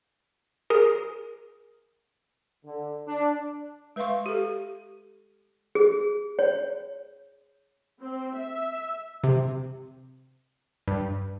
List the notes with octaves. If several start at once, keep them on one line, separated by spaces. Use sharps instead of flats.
G#4 A#4
D3
D4
G#3 B4 E5 F5 C6 C#6
G4 A4
G#4
C#5
C4
E5
C3
G2